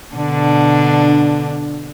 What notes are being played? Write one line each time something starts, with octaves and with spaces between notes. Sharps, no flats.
B2 D3 D4